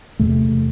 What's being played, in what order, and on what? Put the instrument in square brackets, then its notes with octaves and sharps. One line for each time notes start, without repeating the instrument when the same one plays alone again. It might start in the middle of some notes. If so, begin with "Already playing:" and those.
[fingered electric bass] E2 C3 A3